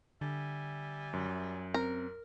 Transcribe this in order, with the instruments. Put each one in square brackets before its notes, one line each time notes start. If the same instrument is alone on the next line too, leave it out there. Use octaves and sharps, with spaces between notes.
[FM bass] D3 [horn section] G3 E5 G#5
[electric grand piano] F#2
[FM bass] C4 [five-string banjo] A#4